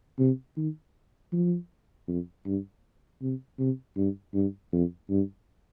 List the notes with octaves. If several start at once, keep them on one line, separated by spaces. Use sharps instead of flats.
C3
D#3
F3
F2
G2
C3
C3
G2
G2
F2
G2